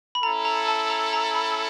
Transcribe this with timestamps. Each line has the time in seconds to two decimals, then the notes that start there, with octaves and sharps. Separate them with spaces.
0.15 B5
0.22 C#4 E4 A4 A#5
0.45 A#5
0.68 A5
0.90 A#5
1.13 A#5
1.35 B5